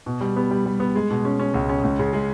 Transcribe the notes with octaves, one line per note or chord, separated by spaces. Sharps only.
B2
G3
B3
G3
G3
B3
G#3
B2
C#4
C#4
C#2
C#4
C#2
C#3
G#3